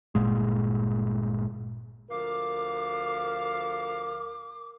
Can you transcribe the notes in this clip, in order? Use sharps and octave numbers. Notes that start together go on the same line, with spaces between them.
G1 A#2 G#3
D2 F3 A#4 F5 D6